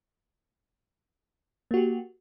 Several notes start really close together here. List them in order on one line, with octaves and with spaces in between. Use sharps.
A#3 F#4 G4